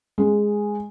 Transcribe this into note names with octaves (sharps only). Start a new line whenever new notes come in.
G#3